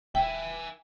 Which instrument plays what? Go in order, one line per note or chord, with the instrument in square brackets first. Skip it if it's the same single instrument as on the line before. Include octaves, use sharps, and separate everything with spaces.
[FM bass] D#1 [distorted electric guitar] E5 G#5 [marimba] G5